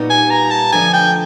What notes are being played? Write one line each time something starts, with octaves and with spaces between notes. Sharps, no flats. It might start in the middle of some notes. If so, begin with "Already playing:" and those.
Already playing: A#2 G3 B3 D#4 F#4
G#5
A#5
A5
D3 F3 A3 G#5
G5